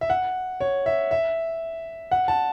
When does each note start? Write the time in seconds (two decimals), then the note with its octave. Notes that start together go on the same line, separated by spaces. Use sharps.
0.01 E5
0.10 F#5
0.60 C#5
0.86 E5
1.11 E5
2.11 F#5
2.28 A5